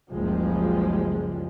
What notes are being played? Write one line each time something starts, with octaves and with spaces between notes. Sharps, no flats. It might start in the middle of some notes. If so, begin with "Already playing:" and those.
F#1 C#2 F3 G3 G#3